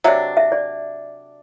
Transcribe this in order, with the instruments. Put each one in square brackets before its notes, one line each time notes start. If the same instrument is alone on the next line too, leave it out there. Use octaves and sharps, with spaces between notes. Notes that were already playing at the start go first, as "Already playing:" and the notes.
[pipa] C3 F#3 A3 D4 [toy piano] E5
[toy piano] E5
D5